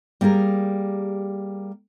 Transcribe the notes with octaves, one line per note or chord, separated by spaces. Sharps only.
G3 A#3 G4 G#4 A#4